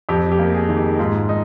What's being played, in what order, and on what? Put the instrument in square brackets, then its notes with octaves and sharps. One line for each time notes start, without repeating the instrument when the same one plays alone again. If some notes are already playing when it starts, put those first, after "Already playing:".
[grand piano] F2 G4
G4
A#3
G#4
D#3
G4
G#2 F4
D#4